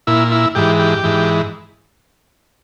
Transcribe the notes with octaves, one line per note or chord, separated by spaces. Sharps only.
A#2 E4
E4
G#2 E3 G4
G4
G#2 E3